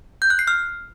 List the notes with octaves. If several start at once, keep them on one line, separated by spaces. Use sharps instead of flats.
G6
F#6
C7
F6